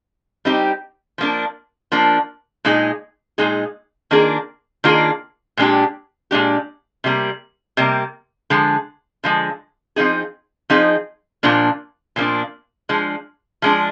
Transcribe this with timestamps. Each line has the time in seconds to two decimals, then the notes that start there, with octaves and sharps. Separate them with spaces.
0.45 G3 C4 D#4 G4
1.18 F3 A#3 D4
1.92 F3 A#3 D4
2.65 A#2 G#3 D#4 G#4
3.38 A#2 G#3 D#4 G#4
4.11 D#3 A#3 D4 F4 G#4
4.84 D#3 A#3 D4 F4 G#4
5.57 A#2 G#3 D4 G4
6.31 A#2 G#3 D4 G4
7.04 C3 G3 A#3
7.77 C3 G3 A#3
8.50 D3 F3 G#3
9.24 D3 F3 G#3
9.96 F3 C4 D#4 G#4
10.70 F3 C4 D#4 G#4
11.43 A#2 F3 A#3 D4
12.16 A#2 F3 A#3 D4
12.89 F3 G#3 D4
13.62 F3 G#3 D4